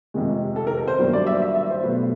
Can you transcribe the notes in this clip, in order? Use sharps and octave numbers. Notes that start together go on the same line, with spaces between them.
F2 C3 D#3 G#3
A4
A#4
A#4
C5
G2 D#3 F#3 A#3
D5
E5
E5
E5
C5
B2 F#3 A3 B4